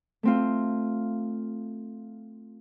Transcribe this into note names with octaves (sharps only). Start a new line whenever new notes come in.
A3 C4 F4